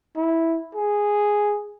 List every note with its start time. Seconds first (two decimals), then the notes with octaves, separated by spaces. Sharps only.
0.16 E4
0.75 G#4